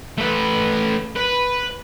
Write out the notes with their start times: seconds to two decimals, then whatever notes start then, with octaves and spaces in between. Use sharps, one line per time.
0.18 A3 B4
1.16 B4